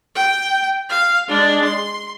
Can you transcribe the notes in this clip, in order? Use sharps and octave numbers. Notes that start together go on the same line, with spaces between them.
G5
F5
G#3 D4
C6